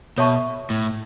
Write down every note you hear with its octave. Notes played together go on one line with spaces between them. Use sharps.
B2 A4 C#5 E5 A5 C#6
A2